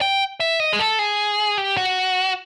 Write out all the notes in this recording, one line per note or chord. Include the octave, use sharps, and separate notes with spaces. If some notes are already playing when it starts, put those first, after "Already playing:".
G5
E5
D#5
G#4
A4
G#4
G4
F#4